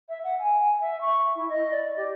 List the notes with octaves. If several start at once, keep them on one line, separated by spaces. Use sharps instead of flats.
E5
F#5
G#5
E5
C#6
E4
D#5
D5
G4